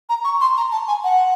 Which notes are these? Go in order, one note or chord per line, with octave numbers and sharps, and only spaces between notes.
A#5
C#6
C6
A#5
A5
G#5
F#5